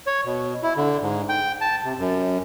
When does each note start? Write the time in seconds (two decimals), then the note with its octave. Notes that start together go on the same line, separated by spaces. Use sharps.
0.07 C#5
0.26 B2
0.63 E4
0.77 D3
1.02 G#2
1.29 G5
1.61 A5
1.85 C3
1.98 F#2